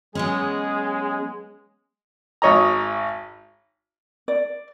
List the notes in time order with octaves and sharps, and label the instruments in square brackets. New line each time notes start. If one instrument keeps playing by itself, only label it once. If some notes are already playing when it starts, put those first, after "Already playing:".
[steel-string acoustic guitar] F#3 B3 C#4 [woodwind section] G#3 [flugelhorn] G#4
[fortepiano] G#1 C#5 D#5 A#5
[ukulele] D5